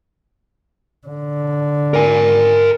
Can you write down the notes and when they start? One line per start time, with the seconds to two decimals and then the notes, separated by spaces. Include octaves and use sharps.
1.07 D3
1.94 A#4 G#5